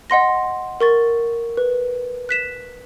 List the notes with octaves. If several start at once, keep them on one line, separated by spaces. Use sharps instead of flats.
D#5 F#5 C6 A#6
A#4 C#6 A6
B4
F#6 B6 E7